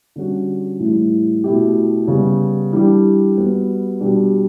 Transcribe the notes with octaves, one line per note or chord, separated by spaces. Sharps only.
D3 G3 C#4 F#4
A2 E3 G3
B2 A3 E4 G4
C#3 G3 B3
E3 G3 D4 G4
G3 B3 F#4
B2 G3 D4 G4